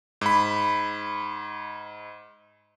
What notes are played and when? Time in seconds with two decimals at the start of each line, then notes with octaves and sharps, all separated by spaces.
0.21 G#2 B5